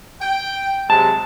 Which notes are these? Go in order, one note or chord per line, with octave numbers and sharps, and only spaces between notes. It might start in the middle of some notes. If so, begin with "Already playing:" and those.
G5
C3 F#3 G#3 A5